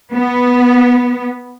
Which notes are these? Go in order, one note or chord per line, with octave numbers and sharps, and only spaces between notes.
B3